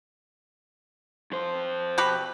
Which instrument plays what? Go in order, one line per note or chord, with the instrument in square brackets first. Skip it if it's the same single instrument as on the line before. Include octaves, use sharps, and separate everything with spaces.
[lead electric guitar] F2 C5
[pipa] B2 G4 B4